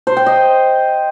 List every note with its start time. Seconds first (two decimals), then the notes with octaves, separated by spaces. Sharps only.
0.07 C5
0.17 G5
0.26 D#5